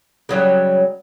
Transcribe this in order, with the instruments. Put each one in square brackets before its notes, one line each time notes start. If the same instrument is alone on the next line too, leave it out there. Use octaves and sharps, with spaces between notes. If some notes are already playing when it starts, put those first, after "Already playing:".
[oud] C#3 F#3 G3